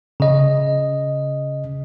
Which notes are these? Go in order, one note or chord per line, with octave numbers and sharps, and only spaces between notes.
C#3 D#5